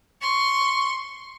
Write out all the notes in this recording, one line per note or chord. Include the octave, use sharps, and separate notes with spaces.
C6 C#6